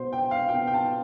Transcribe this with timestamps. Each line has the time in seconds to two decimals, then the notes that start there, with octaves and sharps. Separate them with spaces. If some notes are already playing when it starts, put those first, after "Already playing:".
Already playing: B2 B3 C5
0.13 G5
0.31 F5
0.49 B2 B3 G5
0.67 G5
0.74 A5